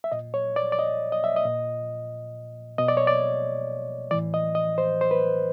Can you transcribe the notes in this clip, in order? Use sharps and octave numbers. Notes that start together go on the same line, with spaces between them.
E5
A#2 D#5
C#5
D5
D5
D#5
D#5
E5
D#5
A#2
B2 D#5
D5
C#5
D5
A2 E3 D5
D#5
D#5
C5
C5
B4